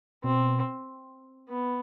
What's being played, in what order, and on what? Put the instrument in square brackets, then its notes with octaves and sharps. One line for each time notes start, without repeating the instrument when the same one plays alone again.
[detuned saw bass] B2 [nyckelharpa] C4
[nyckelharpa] B3